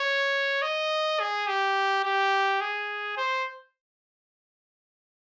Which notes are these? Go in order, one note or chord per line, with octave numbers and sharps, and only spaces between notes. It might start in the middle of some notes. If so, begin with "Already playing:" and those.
Already playing: C#5
D#5
G#4
G4
G4
G#4
C5